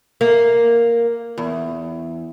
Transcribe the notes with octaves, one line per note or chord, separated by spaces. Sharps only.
A#3
E2